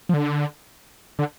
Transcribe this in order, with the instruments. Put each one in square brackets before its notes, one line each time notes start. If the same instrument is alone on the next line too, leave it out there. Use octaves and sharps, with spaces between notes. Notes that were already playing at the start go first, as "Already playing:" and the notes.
[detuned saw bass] F3
D3
D3